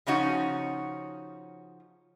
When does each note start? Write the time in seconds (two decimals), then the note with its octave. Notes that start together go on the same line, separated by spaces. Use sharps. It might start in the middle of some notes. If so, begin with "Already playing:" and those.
0.07 C#3 F3 C#4 D#4 F#4